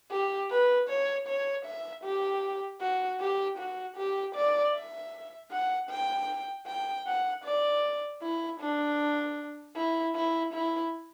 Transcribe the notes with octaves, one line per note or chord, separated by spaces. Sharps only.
G4
B4
C#5
C#5
E5
G4
F#4
G4
F#4
G4
D5
E5
F#5
G5
G5
F#5
D5
E4
D4
E4
E4
E4